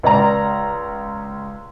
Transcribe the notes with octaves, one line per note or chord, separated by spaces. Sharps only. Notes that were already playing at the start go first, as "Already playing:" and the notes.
C#2 D5 A#5